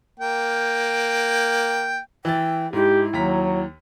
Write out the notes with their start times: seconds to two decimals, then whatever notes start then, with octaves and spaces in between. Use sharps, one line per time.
0.20 A#3 G5
2.25 E3 E4 G5 A6
2.73 G#2 G#3 E4 G4
3.13 D#2 F#3 A#5 B6